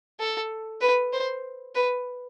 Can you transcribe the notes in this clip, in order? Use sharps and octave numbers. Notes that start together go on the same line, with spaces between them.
A4
B4
C5
B4